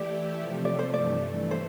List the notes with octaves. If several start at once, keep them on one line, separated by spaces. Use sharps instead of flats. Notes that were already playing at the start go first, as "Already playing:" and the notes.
Already playing: E3 A3 E4 G4 D5
C3 F3 A3
D5
C5
G2 E3 A3 D5
C5